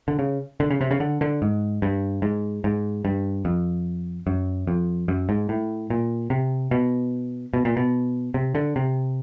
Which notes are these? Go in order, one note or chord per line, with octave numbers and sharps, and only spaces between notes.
D3
C#3
D3
C#3
C3
C#3
D3
D3
G#2
G2
G#2
G#2
G2
F2
F#2
F2
F#2
G#2
A2
A#2
C3
B2
B2
A#2
B2
C3
D3
C3